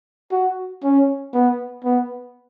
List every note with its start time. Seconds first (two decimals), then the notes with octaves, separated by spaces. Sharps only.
0.32 F#4
0.83 C#4
1.33 B3
1.84 B3